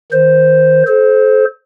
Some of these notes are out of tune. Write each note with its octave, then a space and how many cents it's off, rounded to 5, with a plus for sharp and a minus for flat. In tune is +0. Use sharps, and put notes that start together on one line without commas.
D#3 +15 C5 +0
A4 -35 C5 +0